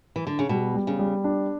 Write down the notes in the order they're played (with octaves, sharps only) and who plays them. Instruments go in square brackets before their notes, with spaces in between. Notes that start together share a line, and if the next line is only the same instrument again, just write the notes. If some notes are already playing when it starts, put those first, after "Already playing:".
[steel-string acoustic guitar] E3
D3
C#3
[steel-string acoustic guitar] B2 [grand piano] G3
[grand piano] G3
[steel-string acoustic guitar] C#3
[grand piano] G3
D4